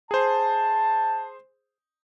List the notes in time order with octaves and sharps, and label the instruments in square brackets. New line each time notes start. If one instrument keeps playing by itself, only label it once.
[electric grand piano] G#4 C5 [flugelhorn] A5